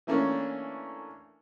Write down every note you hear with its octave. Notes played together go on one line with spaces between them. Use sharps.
E3 A3 A#3 C#4 D4